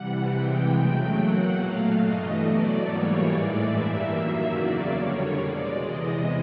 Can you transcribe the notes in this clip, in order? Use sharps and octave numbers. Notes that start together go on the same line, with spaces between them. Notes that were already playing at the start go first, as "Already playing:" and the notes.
Already playing: C3 E3 G3 F#5
C3 E3 G#3 G5
E2 C#3 F#3 A3 G5
B2 F#3 A#3 F#5
A#2 F#3 A3 F5
G2 E3 A3 D#5
B2 F#3 A3 D5
G#2 E3 G3 A#3 C#5
A2 E3 G#3 D5
G2 E3 G3 A#3 E5
F#2 D#3 F#3 A#3 E5
E2 C#3 F#3 A#3 D5
F2 D3 G3 A#3 C#5
B2 G#3 D5
E2 C3 E3 G#3 D#5